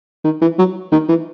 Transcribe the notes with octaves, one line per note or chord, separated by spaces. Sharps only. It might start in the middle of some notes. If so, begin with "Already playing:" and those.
D#3
E3
F#3
D#3
E3